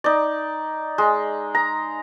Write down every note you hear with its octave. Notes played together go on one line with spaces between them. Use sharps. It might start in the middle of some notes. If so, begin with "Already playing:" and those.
D#4 D5
G#3
A#5